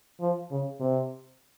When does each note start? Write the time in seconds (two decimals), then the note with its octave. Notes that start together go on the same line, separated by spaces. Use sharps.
0.20 F3
0.51 C#3
0.80 C3